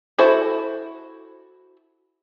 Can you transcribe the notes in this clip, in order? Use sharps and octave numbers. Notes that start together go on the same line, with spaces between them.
E4 F#4 A4 C5 E5